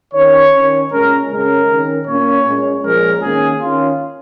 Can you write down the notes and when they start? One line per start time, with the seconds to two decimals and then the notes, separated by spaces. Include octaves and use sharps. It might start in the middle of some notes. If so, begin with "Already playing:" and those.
0.14 D#3 C#4 C#5
0.53 D#3 C#4
0.91 A#2 G#3 C#4 A#4
1.30 C#3 G#3 C#4 A#4
1.69 D#3 C#4
2.07 A#2 A#3 C#4 C#5
2.45 A#2 G#3 C#4
2.84 A#2 F3 G#3 C#4 A#4
3.22 D#3 A#3 C#4 G#4
3.61 D#3 C#4 F4